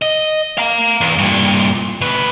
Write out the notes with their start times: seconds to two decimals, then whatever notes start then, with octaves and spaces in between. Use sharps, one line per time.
0.02 D#5
0.58 F5 A#5
1.01 E2
1.18 G2 A#2
2.01 D2 B4